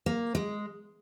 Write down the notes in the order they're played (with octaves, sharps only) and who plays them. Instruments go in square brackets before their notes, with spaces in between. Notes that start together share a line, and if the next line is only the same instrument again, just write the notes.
[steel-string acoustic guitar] A#3
G#3